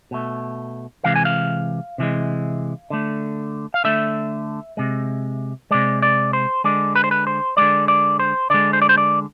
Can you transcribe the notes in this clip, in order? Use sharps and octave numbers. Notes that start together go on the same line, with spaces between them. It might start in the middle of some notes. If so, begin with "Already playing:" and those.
B2 A3
C3 E3 G#3 F5
G#5
F5
C3 E3 G#3
D3 A3
F5
D3 A3 E5
C3 G#3
C3 G#3 D5
D5
C5
D3 G#3 D5
B4
C5
B4
C5
D3 G#3 D5
D5
C5
D3 G#3 D5
C5
D5
C5
D5